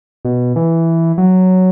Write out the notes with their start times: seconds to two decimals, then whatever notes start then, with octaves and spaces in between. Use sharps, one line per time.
0.25 B2
0.56 E3
1.18 F#3